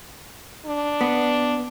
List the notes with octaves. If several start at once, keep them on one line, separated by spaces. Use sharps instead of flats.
D4
B3